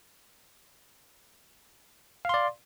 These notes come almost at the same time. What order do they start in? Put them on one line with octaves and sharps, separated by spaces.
F5 C6 D5